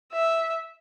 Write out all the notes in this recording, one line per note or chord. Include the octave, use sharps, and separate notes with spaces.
E5